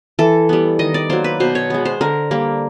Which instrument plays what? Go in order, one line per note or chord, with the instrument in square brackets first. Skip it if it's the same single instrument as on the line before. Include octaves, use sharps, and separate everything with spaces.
[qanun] E3 A4
G3 B3
D#3 D#5
D5
F#3 A#3 C5
B4
B2 C5
C#5
G#3 B3
C5
D3 A#4
G3 A#3